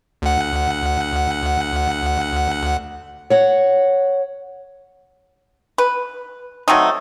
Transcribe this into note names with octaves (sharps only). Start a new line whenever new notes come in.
D2 F#5
C#5 F#5
B4
F#3 A3 C4 D#4